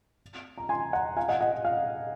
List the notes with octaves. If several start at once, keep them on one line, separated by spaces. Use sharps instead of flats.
A#5
G#5 C6
F#5 A#5
F5 G#5
D#5 F#5
D#5 F#5
F5